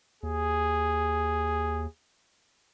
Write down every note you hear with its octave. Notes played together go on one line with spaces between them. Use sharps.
D#2 G#4